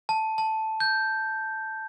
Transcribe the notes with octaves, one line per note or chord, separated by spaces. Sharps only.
A5
A5
G6